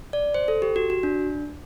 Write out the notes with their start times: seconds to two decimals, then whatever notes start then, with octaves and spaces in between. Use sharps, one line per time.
0.13 D5
0.34 C5
0.48 A4
0.62 G4
0.76 F#4
0.90 F#4
1.03 D4